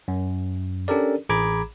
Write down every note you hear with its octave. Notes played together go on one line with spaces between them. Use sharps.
F#2
C#4 D4 G4 A4 A#4 D5
A1 G#4 A#5 B5 D6 G#6